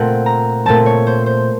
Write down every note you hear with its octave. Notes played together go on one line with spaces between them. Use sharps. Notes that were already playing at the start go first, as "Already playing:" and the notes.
Already playing: A#2 A3 C4 F#5
A#5
A#2 A3 C4 A5
C#5
C5
C5